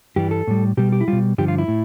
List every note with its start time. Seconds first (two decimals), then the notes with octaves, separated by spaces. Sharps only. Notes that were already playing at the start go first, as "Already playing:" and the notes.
0.16 G2 E3 G3 G4
0.31 A4
0.47 A2 G3
0.77 B2 G3 G4
0.92 G4
1.01 E4
1.08 B2 G3 F4
1.38 G2 D3 F3 G4
1.48 F4
1.58 E4
1.68 A2